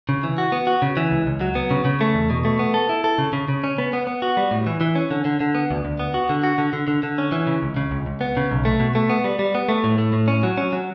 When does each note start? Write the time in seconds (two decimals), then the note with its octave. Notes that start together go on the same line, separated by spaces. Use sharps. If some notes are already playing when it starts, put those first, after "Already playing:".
0.09 C#3
0.23 E3
0.38 F#4
0.52 B3
0.67 F#4
0.82 C#3
0.97 E3
1.11 C#2
1.27 C#2
1.41 F#3
1.55 B3
1.71 C#3
1.85 C#3
2.01 A3
2.15 E2
2.30 B2
2.45 A3
2.59 B3
2.74 A4
2.89 E4
3.04 A4
3.18 C#3
3.33 C#3
3.48 C#3
3.64 C#4
3.78 B3
3.93 B3
4.07 B3
4.22 F#4
4.37 G3
4.51 A2
4.67 E3
4.81 E3
4.95 C#4
5.11 D3
5.25 D3
5.40 D3
5.55 B3
5.71 D2
5.85 D2
5.99 B3
6.14 F#4
6.29 D3
6.44 F#4
6.58 D3
6.73 D3
6.88 D3
7.03 D3
7.18 C#4
7.32 E3
7.47 C#3
7.63 C#2
7.76 C#3
7.91 C#2
8.06 C#2
8.21 B3
8.37 C#3
8.51 B1
8.65 A3
8.80 B2
8.95 A3
9.10 B3
9.24 G3
9.39 G3
9.55 B3
9.69 A3
9.84 A2
9.98 A3
10.13 A2
10.28 C#4
10.43 F#3
10.58 C#4
10.73 F#3